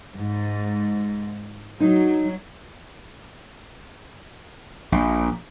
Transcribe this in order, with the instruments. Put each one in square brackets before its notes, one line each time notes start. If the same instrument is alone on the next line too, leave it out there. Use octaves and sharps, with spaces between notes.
[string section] G#2
[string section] F#3 [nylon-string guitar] D#4
[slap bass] A#1